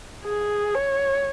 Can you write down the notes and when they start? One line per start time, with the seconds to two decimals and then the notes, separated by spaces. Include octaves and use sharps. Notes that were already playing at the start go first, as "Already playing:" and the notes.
0.25 G#4
0.75 C#5